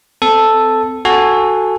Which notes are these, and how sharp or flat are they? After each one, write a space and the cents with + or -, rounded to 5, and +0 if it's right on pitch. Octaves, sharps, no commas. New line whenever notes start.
C4 -30 A4 +0
F#4 +0 A4 +0 G#5 -10